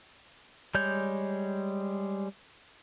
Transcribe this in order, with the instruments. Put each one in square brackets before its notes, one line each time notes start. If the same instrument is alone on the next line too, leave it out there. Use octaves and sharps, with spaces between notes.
[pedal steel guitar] G3 G#3 C#5 G6